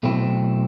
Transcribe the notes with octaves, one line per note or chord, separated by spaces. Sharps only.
B1 B2 A3 C4 E4